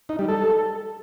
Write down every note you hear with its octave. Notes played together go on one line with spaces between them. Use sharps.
D#4
G3
A4